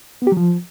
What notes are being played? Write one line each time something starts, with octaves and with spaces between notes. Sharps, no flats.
B3
G4
F#3
F3